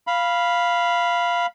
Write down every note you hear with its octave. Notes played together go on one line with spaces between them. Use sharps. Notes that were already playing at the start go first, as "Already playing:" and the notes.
F5 B5